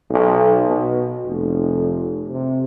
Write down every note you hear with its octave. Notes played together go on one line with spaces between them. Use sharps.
B1
B2
F1
C3